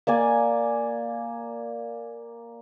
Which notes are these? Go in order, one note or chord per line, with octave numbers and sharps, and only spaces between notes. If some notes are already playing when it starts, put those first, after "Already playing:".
A#3 D5 G#5